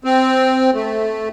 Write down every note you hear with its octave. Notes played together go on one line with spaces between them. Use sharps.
C4
A3